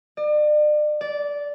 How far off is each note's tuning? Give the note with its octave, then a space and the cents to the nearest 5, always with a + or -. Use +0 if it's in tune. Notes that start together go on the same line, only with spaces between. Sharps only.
D5 +40
D5 -15